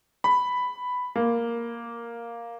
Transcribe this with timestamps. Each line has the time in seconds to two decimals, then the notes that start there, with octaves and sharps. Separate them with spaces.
0.24 B5
1.16 A#3